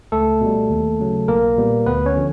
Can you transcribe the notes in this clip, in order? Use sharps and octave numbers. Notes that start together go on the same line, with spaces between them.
C#2 A3 A4
B2 G3
D#2
C#3 F#3
B1 A#3 A#4
A#2 G3 B3
D2 B3 B4
C#4 C#5
D3 F3